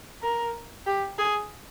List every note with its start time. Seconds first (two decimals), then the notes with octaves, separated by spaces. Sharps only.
0.22 A#4
0.87 G4
1.19 G#4